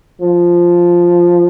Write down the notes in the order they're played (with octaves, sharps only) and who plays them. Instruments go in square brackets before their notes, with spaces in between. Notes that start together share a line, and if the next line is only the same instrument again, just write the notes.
[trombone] F3